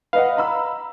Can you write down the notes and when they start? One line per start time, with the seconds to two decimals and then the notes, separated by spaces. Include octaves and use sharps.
0.13 B4 D#5 F5 F#5
0.37 A#5 B5 E6